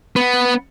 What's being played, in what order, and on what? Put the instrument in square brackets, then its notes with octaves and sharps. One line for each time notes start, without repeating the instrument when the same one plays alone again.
[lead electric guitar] B3